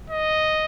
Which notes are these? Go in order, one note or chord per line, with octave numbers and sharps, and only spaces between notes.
D#5